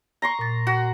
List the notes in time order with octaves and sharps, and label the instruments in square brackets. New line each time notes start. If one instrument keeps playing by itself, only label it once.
[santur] A#5 C6 C#6
[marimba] A#2 A6
[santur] F#4